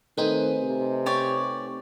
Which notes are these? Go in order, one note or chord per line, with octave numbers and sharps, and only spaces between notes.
D#3 A3 C4 D#4 B4 C5 G#5
C3
G4 C#5 D5